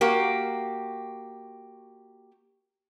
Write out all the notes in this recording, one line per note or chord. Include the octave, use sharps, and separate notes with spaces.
A#3 F#4 G4